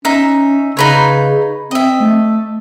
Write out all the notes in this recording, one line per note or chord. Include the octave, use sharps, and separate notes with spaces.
C#4 D#4 E5
C#3 D#4 B4 C#5
C4 D#5 E5
A3